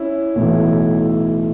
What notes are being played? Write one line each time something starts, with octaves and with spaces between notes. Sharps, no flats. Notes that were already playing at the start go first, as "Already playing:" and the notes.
Already playing: C#4 E4
B1 A2 E3